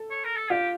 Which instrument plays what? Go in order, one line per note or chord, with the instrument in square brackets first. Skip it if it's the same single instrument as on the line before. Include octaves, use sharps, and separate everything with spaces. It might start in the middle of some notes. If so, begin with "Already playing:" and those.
Already playing: [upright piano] A4
[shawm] C#5
A#4
A4
[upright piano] F4 [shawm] G4